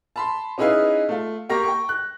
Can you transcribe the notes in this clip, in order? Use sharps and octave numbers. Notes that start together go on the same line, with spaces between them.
A5 B5 C6
C#4 D#4 E4 G#4 B4 F5
A3 F4
A#3 G4 A#5 C#6 A#6
G5 C#6
F#6